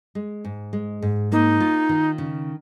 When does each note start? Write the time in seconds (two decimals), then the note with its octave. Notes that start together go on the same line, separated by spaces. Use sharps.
0.15 G#3
0.44 G#2
0.73 G#3
1.02 G#2
1.32 A#3 D#4
1.60 F4
1.89 D#3
2.18 C#3